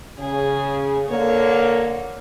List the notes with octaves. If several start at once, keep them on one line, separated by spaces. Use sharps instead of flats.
C#3 G#4
D3 A#3 C#5